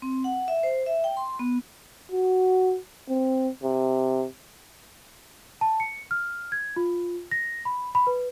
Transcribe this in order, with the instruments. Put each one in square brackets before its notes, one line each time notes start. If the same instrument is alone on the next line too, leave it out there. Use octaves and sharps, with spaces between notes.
[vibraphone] C4
F#5
E5
C5
E5
G5
C6
B3
[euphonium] F#4
C4
C3
[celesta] A5
C#7
F6
G#6
F4
A#6
B5
B5
B4